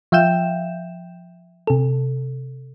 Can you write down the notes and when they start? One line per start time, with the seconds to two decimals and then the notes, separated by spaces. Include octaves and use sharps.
0.12 F3 E5 F5 G5 G6 E7
1.67 C3 A4